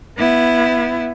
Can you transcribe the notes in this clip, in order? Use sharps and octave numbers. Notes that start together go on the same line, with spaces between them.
B3 E4